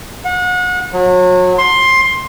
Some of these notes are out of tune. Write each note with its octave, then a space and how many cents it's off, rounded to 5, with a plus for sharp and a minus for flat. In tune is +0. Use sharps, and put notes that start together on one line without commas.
F#5 -35
F#3 -30
C6 +15